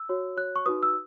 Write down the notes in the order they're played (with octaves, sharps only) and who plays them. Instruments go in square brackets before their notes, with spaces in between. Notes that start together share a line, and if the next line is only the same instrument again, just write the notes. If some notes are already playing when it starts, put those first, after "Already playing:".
Already playing: [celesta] E6
F#4 C#5
F#4 C#5 F#6
C#6
D#4 F#4 B4 D#6
E6